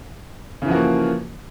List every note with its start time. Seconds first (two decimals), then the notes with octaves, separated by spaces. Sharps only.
0.62 C#3
0.65 E3
0.68 F3
0.71 F#4
0.74 A#3